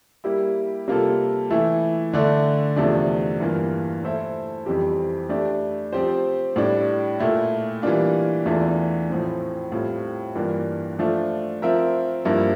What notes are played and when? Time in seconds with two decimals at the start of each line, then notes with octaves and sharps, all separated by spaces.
0.24 G3 A#3 E4 G4
0.88 C3 G3 A#3 F4 A4
1.51 E3 A3 E4
2.13 D3 A3 D4
2.76 E2 C3 F3 A3 D4
3.40 G2 E3 A#3 F4
4.03 A3 E4 A4 C5 E5
4.66 F2 E3 G3 C4 G4
5.29 A3 D4 G4
5.93 F3 C4 G4 C5
6.56 A2 G3 D4
7.20 A#2 A3 E4
7.82 E3 G3 A#3 D4 F4
8.46 E2 E3 A3 D4 F4
9.10 A2 F3 C4
9.72 A2 G3 C4 F4
10.35 G2 E3 A#3 D4 F4
10.99 F3 A3 D4 F4
11.62 F3 C4 F4 A#4 E5
12.25 G2 F3 A#3 E4